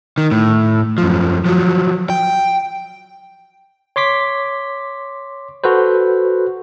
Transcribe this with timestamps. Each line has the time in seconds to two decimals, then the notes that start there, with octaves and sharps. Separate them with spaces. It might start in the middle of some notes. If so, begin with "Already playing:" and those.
0.18 D#3
0.32 A2
0.98 F#2 F3
1.45 F3 F#3
2.10 G5
3.96 C#5 C6 D6 B6
5.64 F#4 A4 B4 C5